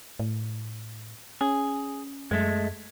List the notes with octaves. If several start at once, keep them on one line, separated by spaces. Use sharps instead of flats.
A2
C#4 G#4
F#2 G#3 A3